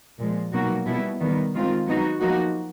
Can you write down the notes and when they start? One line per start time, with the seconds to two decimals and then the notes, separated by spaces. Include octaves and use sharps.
0.20 A#2 F3 G#3
0.53 B2 F#3 A#3 D#4 F#4
0.86 B2 G3 B3 E4
1.20 D#3 G3 B3
1.54 D#3 G#3 C4 F4
1.87 F#3 B3 D#4 F#4
2.20 F3 A#3 D#4 F#4